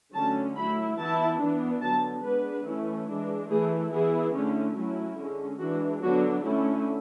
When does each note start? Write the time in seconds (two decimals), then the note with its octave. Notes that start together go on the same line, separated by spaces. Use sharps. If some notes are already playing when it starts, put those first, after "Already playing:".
0.13 D3 F#3 A3 C#4 A5
0.56 F#3 A3 E4 B5
0.97 E3 B3 E4 A5
1.39 E3 B3 D4
1.82 D3 F#3 B3 A5
2.23 G#3 B3 D4 B4
2.65 E3 A3 C#4 E4
3.08 E3 G#3 D4
3.49 E3 A3 E4 G#4
3.91 E3 B3 E4 G#4
4.34 D3 A3 C#4 E4
4.76 F#3 A3 C#4 E4
5.18 D3 G#3 C#4
5.60 E3 G#3 D4 F#4
6.02 D3 F#3 B3 D4 F#4
6.43 D3 A3 C#4 E4